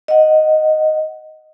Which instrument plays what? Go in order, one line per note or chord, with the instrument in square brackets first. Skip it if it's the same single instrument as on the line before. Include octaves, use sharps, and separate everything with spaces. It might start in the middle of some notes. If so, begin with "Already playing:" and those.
[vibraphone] D#5 F#5